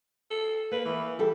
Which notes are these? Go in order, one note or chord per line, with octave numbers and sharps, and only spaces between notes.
A4
A#3 B4
E3
G3 E4 A4